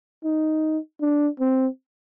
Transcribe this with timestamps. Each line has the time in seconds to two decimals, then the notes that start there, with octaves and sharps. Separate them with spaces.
0.24 D#4
1.01 D4
1.40 C4